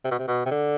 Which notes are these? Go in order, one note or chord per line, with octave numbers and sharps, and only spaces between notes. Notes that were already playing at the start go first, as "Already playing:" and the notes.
C3
B2
C3
B2
C3
D3